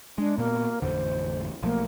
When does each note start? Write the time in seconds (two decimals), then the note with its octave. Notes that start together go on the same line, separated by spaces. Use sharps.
0.18 G#3 D4
0.38 A#2 A#3 B3
0.82 A1 F2 D3 C5
1.63 B1 F3 A3 A#3